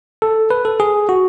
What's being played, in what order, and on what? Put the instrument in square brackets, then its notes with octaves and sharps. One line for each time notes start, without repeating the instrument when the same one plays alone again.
[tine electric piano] A4
B4
A4
G#4
F#4